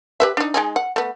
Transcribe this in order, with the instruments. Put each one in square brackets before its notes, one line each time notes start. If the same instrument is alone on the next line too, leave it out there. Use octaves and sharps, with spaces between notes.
[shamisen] G4 B4 E5
D4 D#4
G#3 D#4 G#4
F#5
A3 B3